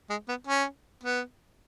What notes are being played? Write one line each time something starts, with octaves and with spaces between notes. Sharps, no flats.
G#3
B3
C#4
B3